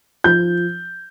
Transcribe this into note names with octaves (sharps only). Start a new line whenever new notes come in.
F3 G6